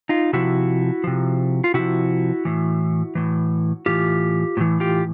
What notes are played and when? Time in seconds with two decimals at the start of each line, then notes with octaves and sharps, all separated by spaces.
0.09 D#4 F4
0.33 C3 F3 E4 F#4
1.04 C3 F3
1.64 F4
1.74 C3 F3 E4 F#4
2.45 A2 E3
3.15 A2 E3
3.86 A2 E3 F4 G4
4.57 A2 E3
4.80 F4 G4